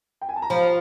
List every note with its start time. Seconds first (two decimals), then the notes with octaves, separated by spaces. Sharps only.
0.21 G5
0.29 G#5
0.36 A5
0.42 A#5
0.50 F3 B5